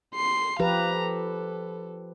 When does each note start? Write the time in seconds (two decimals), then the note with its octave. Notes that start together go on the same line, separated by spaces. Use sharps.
0.15 C6 C7
0.59 F3 G4 B4 F5 A#5
0.99 A4